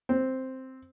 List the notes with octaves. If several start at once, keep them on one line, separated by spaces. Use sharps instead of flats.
C4